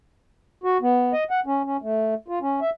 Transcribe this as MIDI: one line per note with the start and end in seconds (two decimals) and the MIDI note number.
0.64 0.78 66
0.82 1.13 59
1.13 1.24 75
1.31 1.40 78
1.46 1.62 61
1.65 1.77 61
1.82 2.14 57
2.28 2.39 65
2.41 2.60 61
2.61 2.70 76